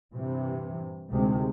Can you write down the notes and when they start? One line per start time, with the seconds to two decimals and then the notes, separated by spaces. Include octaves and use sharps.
0.14 G2 C3 E3
1.11 D2 C3 D#3 G#3